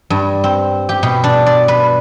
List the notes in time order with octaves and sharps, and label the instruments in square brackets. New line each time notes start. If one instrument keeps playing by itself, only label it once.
[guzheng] G2
C4
G4
B2
D4
D5
B4